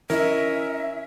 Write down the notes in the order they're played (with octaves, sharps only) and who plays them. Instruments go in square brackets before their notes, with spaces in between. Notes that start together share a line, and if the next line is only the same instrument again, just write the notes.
[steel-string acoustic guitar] C#4 E4 D#5 [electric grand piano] A#4 [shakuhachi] E5